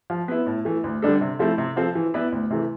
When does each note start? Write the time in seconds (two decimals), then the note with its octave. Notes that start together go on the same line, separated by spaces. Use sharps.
0.10 F3
0.28 B3 E4
0.47 A2
0.65 E3 A3
0.84 D2
1.02 D3 G3 D4 A4
1.21 C3
1.39 F3 A3 C4 E4
1.58 C3
1.76 F3 C4 F4 A4
1.95 E3
2.14 B3 E4 B4 D5
2.32 D2
2.50 C3 E3 A3